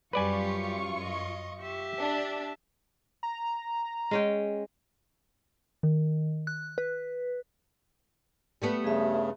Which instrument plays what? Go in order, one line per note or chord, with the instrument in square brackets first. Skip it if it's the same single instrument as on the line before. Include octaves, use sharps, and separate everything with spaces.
[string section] F#2 F4 C#6 [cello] G3 G4 [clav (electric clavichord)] B4 D5 G#5
[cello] D#5
G4 E5
[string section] D4
[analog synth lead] A#5
[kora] G#3 C#4 G5
[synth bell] D#3
F#6
B4
[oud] G3 A3 B3
[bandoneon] G2 C#3 [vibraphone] G#4 E5